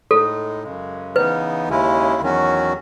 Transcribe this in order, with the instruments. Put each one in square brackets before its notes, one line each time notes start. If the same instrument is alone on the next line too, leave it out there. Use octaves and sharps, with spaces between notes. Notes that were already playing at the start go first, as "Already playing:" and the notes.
[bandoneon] A2 G#3 D#4 [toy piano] A4
[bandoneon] F#2 C#3 G#3
[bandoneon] C#3 E3 B3 D#4 [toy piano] B4
[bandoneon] D#2 C#3 G#3 C#4 E4
E2 D#3 F#3 C#4 F#4